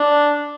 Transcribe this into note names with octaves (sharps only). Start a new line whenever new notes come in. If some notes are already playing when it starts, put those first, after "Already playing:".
Already playing: D4